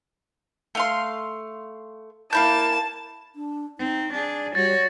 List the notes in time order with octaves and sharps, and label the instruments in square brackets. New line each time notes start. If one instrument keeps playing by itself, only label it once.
[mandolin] A3 F5 C6
[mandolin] A#3 E4 G6 [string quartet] A5
[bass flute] D4
[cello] C4 [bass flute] D#4
[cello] D4 G#4 [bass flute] D5
[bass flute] G3 [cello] F#4 C#5 [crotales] A6